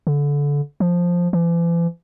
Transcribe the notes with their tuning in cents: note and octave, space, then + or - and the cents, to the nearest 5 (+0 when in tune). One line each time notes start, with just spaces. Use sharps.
D3 -25
F3 +5
E3 +45